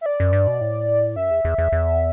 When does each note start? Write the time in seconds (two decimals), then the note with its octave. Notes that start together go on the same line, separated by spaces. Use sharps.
0.01 E5
0.06 D5
0.20 F#2
0.33 G2
0.47 B2
0.61 A2
1.16 F#2 E5
1.31 E2
1.45 E2
1.58 E2
1.72 E2